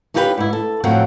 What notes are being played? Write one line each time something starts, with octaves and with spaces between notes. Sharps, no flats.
C#4 D#4 F4 G4 G#4 B4
G#2 E4
A4
F2 A2 F#3 C4 F#5